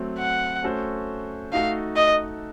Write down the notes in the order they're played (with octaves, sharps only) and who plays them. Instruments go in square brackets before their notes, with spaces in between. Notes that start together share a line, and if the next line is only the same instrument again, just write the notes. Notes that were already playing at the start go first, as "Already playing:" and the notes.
Already playing: [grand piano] F#3 A3 C4
[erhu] F#5
[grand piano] A3 C#4 F#4 A4 C5
[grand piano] A3 D#4 F#4 A4 [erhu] F5
[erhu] D#5